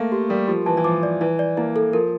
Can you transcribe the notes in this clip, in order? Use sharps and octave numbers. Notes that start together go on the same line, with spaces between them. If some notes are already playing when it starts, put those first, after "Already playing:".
Already playing: A3 A#3 F5
G4
G3 A#4
F3 G4
E3 A5
E3
F3 D6
D5
E3 E4
D5
A#3 E4
A4
F3 A#4